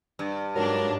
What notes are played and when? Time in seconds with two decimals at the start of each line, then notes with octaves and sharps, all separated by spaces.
0.19 G2
0.55 G#2 F#3 D4 A#4